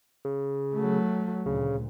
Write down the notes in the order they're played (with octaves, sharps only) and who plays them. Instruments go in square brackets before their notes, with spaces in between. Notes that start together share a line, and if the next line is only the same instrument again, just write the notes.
[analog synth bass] C#3
[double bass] F#3 A3
[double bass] D2 A#2 [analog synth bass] C#3